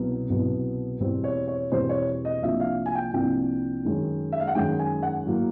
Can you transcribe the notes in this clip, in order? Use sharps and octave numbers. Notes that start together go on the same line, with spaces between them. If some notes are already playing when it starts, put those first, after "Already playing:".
Already playing: C2 B2 F#3 B3
C2 B2 F#3 B3
E2 B2 G3 C4
C#5
C#5
E2 B2 G3 C4 C5
C#5
D#5
C2 C3 F3 A#3 D4 E5
F5
G#5
G5
C2 C3 F3 A#3 D4 G5
F#2 D#3 G#3 C#4
E5
F5
F#5
F#2 D#3 G#3 C#4 G5
G#5
F#5
A2 F#3 A#3